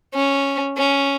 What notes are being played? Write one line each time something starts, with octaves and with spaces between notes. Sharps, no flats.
C#4
C#4